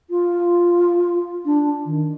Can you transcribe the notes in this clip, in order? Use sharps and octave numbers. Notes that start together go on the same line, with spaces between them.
F4
D4
D#3